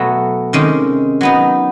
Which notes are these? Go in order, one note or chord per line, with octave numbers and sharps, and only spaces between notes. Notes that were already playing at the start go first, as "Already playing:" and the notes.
Already playing: B2 F#3 A3
C3 D#3 G#3 C#4
F#3 B3 D#4